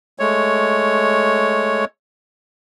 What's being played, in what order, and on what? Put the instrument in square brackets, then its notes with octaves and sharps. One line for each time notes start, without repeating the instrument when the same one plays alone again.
[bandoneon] G#3 A3 C#5